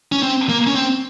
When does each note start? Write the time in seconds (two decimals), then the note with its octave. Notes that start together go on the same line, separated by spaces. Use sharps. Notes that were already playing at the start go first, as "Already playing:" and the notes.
0.12 C#4
0.23 C4
0.49 A#3
0.67 C#4
0.75 C4